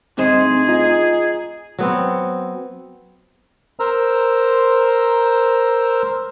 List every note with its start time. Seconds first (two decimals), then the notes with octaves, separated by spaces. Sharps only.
0.18 D2 C4 D#4 G#4 C5
0.68 F4 D#5 A#5
1.78 F#3 B3 C4
3.80 A#4 C5 A#5 E6